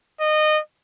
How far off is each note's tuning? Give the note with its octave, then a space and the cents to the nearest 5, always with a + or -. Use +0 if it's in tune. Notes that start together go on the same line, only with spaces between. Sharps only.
D#5 -25